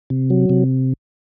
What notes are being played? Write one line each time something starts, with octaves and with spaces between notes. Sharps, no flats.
C3
F#3
C3